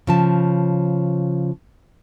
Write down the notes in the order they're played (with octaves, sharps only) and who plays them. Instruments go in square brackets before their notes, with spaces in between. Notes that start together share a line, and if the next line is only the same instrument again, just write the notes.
[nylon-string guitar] C#3 F3 A5